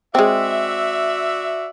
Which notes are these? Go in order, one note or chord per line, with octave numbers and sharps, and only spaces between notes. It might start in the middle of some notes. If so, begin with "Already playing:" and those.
G#3 C4 F#4 D5 E5